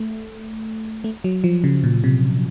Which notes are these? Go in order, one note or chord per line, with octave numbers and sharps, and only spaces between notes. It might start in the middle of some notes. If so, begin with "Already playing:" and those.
Already playing: A3
A3
F#3
F3
C#3
A#2
C3